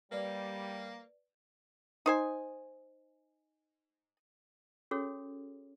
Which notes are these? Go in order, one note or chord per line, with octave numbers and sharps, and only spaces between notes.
G3 A#3 B4 D5
D#4 C5 G#5
C#4 F#4 G#4 A4 C#5